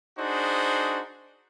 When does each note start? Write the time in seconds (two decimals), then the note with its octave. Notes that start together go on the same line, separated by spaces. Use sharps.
0.18 D4 D#4 F#4 G#4 C5